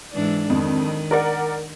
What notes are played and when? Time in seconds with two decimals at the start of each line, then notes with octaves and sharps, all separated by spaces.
0.13 G#2 E3 D4
0.50 F2 D#3
1.11 A#4 D5 F#5